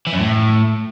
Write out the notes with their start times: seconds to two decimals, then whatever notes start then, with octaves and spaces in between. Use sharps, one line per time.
0.07 E3
0.13 F#2
0.19 A2